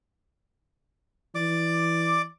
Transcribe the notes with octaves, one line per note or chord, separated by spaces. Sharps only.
E3 D5 D6